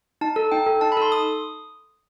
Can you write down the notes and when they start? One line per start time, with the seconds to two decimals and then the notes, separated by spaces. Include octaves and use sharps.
0.21 D#4 A5
0.36 A4
0.52 D#4 G5
0.66 A4
0.81 D#4 A5
0.92 B5
0.97 A4 C6
1.12 D#6